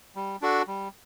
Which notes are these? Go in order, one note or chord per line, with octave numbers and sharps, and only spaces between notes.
G3
D4 F#4 A4
G3